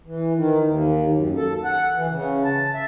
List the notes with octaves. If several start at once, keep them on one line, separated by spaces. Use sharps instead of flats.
E3
D#3
D#2
F#2
A4
F#5
E3
C#3
A5
E5